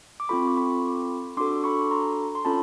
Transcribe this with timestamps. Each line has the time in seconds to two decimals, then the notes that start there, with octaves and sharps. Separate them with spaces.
0.20 D6
0.29 C4 F4 A4 B5 C#6
0.48 D6
0.56 B5 C#6
1.37 D4 F#4 A4 C6 D6
1.64 B5 C#6
1.91 A#5 C6
2.35 C6
2.45 C#4 F4 A4 A5 B5